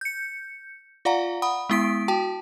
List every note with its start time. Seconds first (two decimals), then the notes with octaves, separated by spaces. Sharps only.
0.01 G6 C#7
1.05 F4 D5 F5 F#5 A#5
1.42 F#5 B5 D#6
1.69 G#3 B3 E4 D#6 B6 D7
2.08 F#4 G5 A5